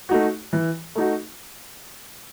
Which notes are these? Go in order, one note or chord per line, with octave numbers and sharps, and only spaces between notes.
A3 D#4 F#4
E3
A3 D#4 F#4